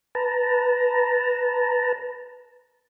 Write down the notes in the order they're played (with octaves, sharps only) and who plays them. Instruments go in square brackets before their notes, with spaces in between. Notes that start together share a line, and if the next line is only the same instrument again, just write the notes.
[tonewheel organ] B4 A5 A#5